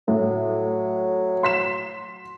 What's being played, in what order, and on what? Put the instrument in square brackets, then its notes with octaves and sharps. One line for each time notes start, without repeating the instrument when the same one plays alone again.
[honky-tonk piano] A2 [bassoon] F#3
[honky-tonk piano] C6 B6 E7